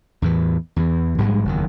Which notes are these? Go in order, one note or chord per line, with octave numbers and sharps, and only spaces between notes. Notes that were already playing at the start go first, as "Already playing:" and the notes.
E2 A2 E3
E2 E3
A#1 G#2 G3 G#3
F#1 E2 D#3